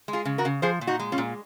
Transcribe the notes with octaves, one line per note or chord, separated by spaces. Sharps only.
G#3
F4 G#4
C#3
F#4 A#4
C#3
F3 G#4 C5
A#2
D#4 F#4
G#3
C#4 F4
A#2